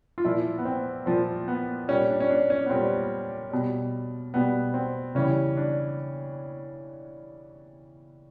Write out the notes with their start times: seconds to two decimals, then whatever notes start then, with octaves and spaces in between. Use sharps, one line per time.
0.18 F4
0.25 A#2 F3 E4
0.58 B3
0.65 C4
1.06 A#2 F3 C4
1.48 B3
1.88 A#2 G3 C#4
2.08 D4
2.20 C#4
2.30 D4
2.50 C#4
2.66 B3
2.69 A#2 G3 C4
3.51 B2 G3
4.34 B2 G3 B3
4.74 C4
5.15 C#3 E3 G3 C#4
5.57 D4